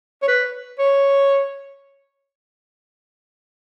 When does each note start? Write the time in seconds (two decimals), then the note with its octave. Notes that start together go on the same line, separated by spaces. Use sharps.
0.22 C#5
0.28 B4
0.79 C#5